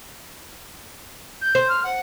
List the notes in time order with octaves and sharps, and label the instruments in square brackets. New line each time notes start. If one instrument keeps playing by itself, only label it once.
[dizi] G6
[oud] C5
[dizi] F6
F#5